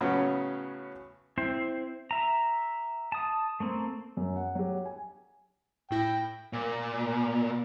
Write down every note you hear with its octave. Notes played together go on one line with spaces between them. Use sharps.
A2 C#3 F#3 B3 C#4
C4 E4 C5
E5 A#5
A5 D#6
A3 A#3 C4
F#2
F#5
F#3 G4
G#5
A2 E4 G5 A#6
A#2